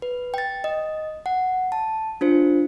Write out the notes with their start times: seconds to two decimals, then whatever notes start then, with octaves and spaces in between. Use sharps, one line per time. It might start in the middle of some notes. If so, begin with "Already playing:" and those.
0.02 B4
0.34 G5 A6
0.64 D#5
1.26 F#5
1.72 A5
2.21 D4 F4 C5